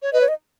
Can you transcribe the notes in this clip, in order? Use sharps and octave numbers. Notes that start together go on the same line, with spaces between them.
C#5
B4 D#5
C#5
D#5